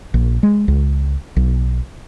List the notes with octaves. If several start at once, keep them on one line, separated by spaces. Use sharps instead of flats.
A#1
G#3
C#2
B1